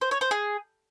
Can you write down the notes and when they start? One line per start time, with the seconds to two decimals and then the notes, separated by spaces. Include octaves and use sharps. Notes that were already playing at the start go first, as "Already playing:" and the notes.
0.01 C5
0.11 C#5
0.21 C5
0.31 G#4